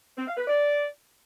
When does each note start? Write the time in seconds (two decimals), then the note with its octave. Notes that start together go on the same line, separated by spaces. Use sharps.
0.17 C4
0.27 F5
0.37 B4
0.47 D5